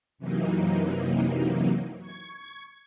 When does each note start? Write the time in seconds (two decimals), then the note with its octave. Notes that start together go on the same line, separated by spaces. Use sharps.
0.18 F#2 C3 E3 F#3 A#3 D#4
1.99 C#6 G#6